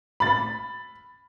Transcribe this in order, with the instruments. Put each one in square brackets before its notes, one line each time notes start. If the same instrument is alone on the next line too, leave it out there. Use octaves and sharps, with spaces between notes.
[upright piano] B5 A6